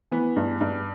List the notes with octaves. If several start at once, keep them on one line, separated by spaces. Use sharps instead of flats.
E3 B3
G2
G2